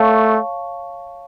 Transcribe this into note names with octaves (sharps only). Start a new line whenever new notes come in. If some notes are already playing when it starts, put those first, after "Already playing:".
Already playing: A3 C#5 F5 A5 C#6